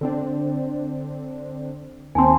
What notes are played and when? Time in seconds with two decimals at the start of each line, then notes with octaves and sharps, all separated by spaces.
0.01 D3 C4 D4
2.15 D#2 C4 G#5 A5 C6